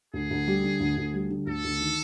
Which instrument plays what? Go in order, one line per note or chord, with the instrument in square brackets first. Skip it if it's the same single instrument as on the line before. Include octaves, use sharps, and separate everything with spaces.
[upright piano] D2 [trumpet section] G#4
[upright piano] D2
G3
D3
D2
D2
G3
D3
[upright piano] D2 [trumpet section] A4
[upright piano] D2
D#3